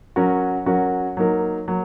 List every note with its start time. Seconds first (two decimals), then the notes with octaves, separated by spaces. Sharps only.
0.16 F#3 C#4 F#4 A#4
0.66 F#3 C#4 F#4 A#4
1.17 F#3 A#3 D#4 A#4
1.68 F#3 A#3